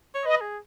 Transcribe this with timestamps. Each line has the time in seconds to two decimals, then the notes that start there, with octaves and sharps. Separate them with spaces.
0.15 C#5
0.25 B4 D#5
0.41 G#4